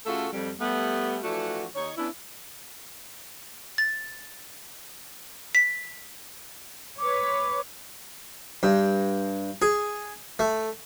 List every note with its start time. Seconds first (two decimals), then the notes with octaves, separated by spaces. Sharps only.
0.06 C#3 A3 C#4 F4 F#4 A4
0.33 F2 G3
0.60 G3 A3 B3
1.23 E3 F3 A3 D4 F#4
1.75 D#2 D#4 C#5
1.97 B3 C#4 D4 E4
3.78 A6
5.55 B6
6.99 B4 C#5 D6
8.63 G2
9.62 G#4
10.39 A3